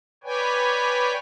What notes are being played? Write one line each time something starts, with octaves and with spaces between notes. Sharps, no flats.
B4 C#5 D5 G5 G#5